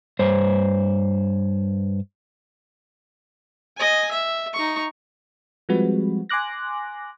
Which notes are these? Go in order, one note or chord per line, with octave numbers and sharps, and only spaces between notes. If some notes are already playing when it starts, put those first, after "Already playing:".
G2 C5 C#5
D#5 G#5
E5
D#4 C#6
F3 G3 G#3 C4 F#4 B4
G#5 C6 D6 F#6 A#6